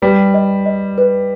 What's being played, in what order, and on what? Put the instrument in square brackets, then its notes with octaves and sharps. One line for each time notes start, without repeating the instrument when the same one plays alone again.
[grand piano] G3 [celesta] B4
[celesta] D#5
D#5
B4